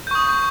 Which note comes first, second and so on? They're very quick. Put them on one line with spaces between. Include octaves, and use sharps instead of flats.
G6 C#6 D#6